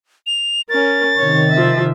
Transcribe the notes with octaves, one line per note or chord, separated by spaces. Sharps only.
F7
C#4 A#4 A6
C3 D#3 C#5
F3 E5